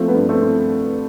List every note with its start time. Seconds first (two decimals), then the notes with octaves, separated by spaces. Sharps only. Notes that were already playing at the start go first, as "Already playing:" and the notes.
Already playing: F3 A3 C4
0.08 B3
0.14 G2
0.29 A3 C4
0.42 C4